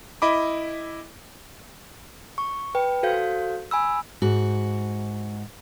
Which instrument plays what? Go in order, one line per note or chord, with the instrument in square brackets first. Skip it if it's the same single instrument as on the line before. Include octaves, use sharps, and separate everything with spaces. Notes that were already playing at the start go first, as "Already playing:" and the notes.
[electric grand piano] E4 D#5 B5 D6
[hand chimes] C#6
B4 G5
F#4 A4 C5 F5 G6
G#5 B5 E6
[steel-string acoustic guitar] G#2 F#4